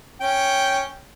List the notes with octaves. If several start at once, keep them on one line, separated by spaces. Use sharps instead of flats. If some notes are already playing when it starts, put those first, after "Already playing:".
C#4 G5